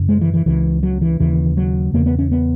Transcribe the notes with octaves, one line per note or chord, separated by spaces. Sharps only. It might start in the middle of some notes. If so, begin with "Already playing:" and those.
Already playing: F#2 C#3
G#3
E3
E3
C#2 C#3 E3
F#3
E3
D#2 C#3 E3
F#3
E2 C#3 A#3
B3
C#4
B3